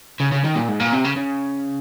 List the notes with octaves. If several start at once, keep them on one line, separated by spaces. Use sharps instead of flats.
C#3
C#3
D#3
A#2
G#2
A#2
C3
C#3
C#3